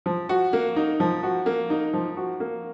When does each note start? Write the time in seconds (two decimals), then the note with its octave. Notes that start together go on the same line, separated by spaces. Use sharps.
0.06 F3
0.29 F#4
0.53 A#3
0.76 D#4
1.00 F3
1.23 F#4
1.46 A#3
1.70 D#4
1.94 F3
2.17 F#4
2.40 A#3